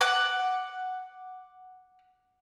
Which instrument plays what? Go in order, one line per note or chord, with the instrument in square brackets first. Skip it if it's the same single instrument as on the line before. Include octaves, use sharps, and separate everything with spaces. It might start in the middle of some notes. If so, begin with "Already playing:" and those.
[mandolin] F#5 D6